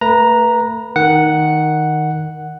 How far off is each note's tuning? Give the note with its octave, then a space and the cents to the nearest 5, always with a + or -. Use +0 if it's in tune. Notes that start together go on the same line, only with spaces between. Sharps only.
A3 +30 B4 -20 A#5 +0
D#3 +0 F#5 +0